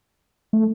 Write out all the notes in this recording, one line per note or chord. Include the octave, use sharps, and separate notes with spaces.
A3